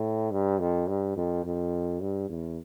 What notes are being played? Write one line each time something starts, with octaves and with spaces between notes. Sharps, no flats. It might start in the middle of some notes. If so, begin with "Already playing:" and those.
Already playing: A2
G2
F2
G2
F2
F2
G2
E2